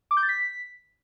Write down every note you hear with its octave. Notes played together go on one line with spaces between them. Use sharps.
D6
G6
A6
B6